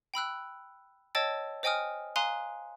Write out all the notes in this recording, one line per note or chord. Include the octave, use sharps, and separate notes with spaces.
G5 B5 E6 F#6
C#5 D#5 G5 A5 E6 A6
C5 D#5 G5 G#5 D#6 F6
F5 G#5 A#5 C6 D#6 F#6